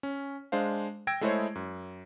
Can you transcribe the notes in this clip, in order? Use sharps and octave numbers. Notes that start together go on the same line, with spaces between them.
C#4
G#3 D4 C5 F5
G5 E6 G#6 A#6 D7
G#3 A3 E4 G#4 C5 C#5
F#2